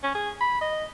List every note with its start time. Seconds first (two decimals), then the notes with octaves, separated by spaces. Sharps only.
0.03 C#4
0.15 G#4
0.40 B5
0.61 D#5